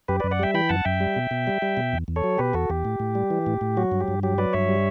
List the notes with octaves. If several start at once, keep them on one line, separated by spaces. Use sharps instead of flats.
F#2 G4 B4
F#2 B4 D5
D5 F#5
G3 E5 G5
E3 G5 B5
F#2 F#5 A5
F#2 E5 G5
G3
B2
B2
G3
G3
B2
E2
E2
A4 C#5
F#3
B2 G4 B4
E2 F#4 A4
E2 G4
A2
A2
G3
E3
A2
A2
F#3 F#4
G2
G4
G2
F#3 G4
F#3 B4 D5
G2 C#5 E5
G3